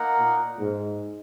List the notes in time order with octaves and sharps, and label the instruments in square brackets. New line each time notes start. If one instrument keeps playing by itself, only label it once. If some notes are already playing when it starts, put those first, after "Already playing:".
Already playing: [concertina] A#3 D#4 A#4 F#5
[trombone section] A#2
G#2